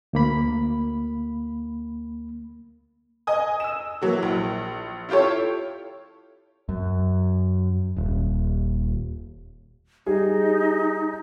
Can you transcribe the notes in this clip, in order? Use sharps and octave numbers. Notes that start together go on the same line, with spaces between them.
D2 A#3 B5
D#5 G#5 D#6
E6 E7
E3 F#3 A#3
A#1
E4 F4 G4 A4 C#5
F#2
D#1
G3 D#4 G#4